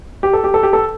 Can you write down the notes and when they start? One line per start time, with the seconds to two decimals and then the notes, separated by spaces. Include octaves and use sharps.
0.23 G4
0.33 A4
0.44 G4
0.54 A4
0.63 G4
0.73 A4